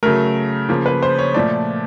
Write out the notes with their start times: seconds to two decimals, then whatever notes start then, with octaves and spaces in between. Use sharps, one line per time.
0.03 C#3 F#3 A3 A#4
0.69 C#3 F3 A#3
0.86 B4
1.03 C5
1.19 C#5
1.34 A#2 F3 A3 D5